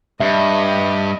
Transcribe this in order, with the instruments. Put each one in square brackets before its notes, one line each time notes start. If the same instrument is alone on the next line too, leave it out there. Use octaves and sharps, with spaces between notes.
[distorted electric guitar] G2 [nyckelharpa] D#5 [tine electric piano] E5